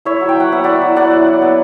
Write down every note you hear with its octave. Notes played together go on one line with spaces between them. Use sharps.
E4 C#5 E5
F#3
G5
F#3 F#5
B3 E5
E4 D5 F#5
F#3
E4 D5 F#5
F#3
F#3
B3